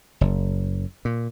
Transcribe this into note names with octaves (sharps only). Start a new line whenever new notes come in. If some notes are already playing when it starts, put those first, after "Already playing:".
F#1
A#2